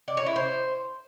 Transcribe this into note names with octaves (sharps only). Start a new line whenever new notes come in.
D5
C#5
E4
C5